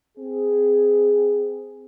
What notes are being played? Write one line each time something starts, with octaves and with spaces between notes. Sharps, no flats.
C4 G#4